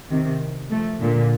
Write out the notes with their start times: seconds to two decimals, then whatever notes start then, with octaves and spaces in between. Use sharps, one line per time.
0.10 C3 D#3
0.70 F3 A3
1.01 A#2 D3